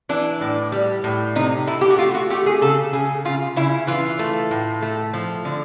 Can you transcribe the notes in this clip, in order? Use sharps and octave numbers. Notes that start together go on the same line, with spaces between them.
E3 D4
A2
G3
A2
C3 D#4
A3 E4
G4
F#4
A3 F4
F#4
A3 G4
G#4
C#3 A4
C#3 G#4
C#3 F4
C#3 E4
E3 F4
A3
A2
A3
F3
D3